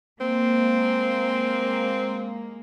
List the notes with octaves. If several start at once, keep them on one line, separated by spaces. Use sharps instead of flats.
G#3 A#3 C4